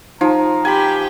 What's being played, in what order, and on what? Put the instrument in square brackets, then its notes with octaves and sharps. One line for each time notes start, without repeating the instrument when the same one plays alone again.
[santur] F3 [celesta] D#4 [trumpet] A#5
[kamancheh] G4 G5 [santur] G#5 B5